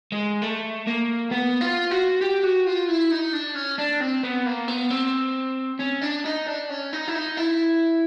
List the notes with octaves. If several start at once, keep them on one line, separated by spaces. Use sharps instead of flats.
G#3
A3
A#3
B3
F4
F#4
G4
F#4
F4
E4
D#4
D4
C#4
D4
C4
B3
A#3
B3
C4
C#4
D4
D#4
D4
C#4
D#4
E4
D#4
E4